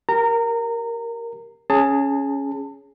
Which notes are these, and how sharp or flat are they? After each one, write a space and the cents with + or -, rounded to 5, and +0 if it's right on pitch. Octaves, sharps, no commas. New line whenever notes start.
G4 +0 A#4 +0 A#5 -25
C#4 +0 G#4 +0 A5 +30